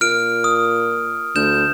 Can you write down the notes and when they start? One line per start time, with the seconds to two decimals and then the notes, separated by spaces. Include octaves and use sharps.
0.01 A#2 F6 D7
0.44 D#6
1.36 D2 G6 E7